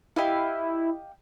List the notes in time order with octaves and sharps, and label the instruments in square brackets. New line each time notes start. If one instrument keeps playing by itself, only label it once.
[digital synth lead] E4 [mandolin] G4 D#5 F5